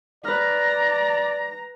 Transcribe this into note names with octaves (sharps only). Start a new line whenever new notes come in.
B4 D5 A#5 F6